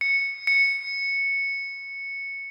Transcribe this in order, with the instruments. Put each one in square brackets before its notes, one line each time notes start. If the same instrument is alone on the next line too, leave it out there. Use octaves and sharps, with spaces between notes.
[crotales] C#7
C#7